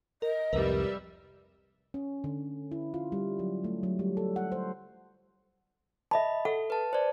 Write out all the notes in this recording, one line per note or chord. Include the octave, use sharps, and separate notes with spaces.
A#4 D#5
C2 F2 G#2 G3 A#4 B4 E5
C#4
D3
E4
F4
G3
F#3
A3
F#3
G3
A4
F#5
C5
D#5 E5 A5 B5
A4 F#5
B4 A5
C5 D5